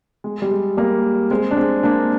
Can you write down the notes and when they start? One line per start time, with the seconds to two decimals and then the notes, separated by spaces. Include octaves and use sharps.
0.24 G#3
0.42 G3
0.51 G#3
0.77 G3 A#3
1.31 G#3 C4
1.51 D4
1.56 G#3 C4
1.83 A#3 D4